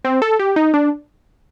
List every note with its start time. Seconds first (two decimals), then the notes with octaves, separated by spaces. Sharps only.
0.05 C4
0.22 A4
0.39 G4
0.56 D#4
0.74 D4